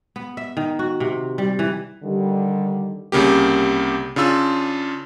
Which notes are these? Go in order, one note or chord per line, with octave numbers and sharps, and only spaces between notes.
B3
E5
D#3
F#4
C3
G3
E3
D3 D#3 G3
C2 C#3 A#3 G4
C#3 D4 F4 E6